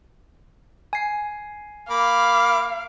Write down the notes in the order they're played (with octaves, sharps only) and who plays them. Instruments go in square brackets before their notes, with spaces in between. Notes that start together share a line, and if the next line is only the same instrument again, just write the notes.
[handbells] G#5 C7
[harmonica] A#3 B5 D6 [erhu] F5